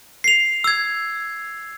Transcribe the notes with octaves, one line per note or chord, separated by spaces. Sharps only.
C7 F7
E6 G#6